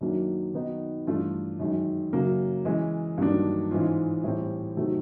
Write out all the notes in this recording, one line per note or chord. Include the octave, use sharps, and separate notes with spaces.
F#2 D#3 F#3 A#3 D4
D#3 F#3 B3 D#4
G2 E3 A3 D4 F4
F#2 D#3 G#3
F#2 C#3 F#3 A#3
E3 G#3 C#4
G2 D#3 F#3 A#3 D4
G#2 E3 G#3 C#4 F4
A2 E3 G3 C4
C3 D#3 F#3 A3